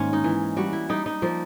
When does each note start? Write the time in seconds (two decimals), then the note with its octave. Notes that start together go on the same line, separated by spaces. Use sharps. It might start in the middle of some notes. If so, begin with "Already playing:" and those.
Already playing: G#2 D#3 A#3 C#4
0.13 D#4
0.24 E3
0.57 G3 F#4
0.73 E4
0.89 G3 D#4
1.06 D#4
1.22 F3 A#3